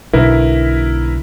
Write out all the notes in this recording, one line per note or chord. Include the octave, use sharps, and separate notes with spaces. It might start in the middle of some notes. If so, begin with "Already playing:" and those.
B1 B2 D3 E4 A#4 B4